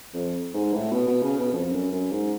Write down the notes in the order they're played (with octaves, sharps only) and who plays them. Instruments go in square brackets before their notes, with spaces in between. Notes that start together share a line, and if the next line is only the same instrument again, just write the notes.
[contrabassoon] F2
G#2
A2
B2
B2
C#3
B2
F2
F#2
F#2
G#2